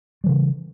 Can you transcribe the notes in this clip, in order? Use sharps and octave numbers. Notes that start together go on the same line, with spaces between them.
C#3 E3 G3